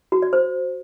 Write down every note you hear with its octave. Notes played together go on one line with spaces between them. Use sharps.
F#4
D5
C5